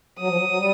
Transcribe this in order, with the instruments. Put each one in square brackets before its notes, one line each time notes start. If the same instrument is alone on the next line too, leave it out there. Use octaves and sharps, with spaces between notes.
[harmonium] F#3 [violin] D#6
[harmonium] F3
F#3
F#3
G3